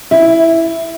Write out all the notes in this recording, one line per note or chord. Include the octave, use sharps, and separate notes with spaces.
E4